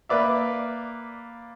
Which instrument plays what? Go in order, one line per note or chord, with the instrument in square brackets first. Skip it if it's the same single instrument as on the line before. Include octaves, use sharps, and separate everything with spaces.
[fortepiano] A#3 B4 D5 E5